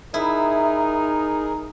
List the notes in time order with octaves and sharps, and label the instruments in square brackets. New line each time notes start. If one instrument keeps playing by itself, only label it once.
[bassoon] D#4 [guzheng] E4 [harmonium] G#4 A#4